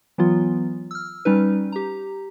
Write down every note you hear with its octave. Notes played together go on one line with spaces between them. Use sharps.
E3 F#3 B3 F4
E6 F6
G3 C#4 D#4 B4
G4 A#5